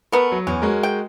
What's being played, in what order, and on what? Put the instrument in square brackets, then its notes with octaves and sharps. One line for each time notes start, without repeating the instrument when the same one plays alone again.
[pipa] A3 B3 [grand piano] A#4
[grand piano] F#3
[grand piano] E2 [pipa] C#4
[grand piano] G#3 F#4 A#4
[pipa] G5